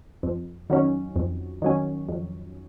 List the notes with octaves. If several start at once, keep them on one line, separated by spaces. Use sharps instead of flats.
F2
D#3 F#3 C#4
F2
D#3 F#3 C#4
F2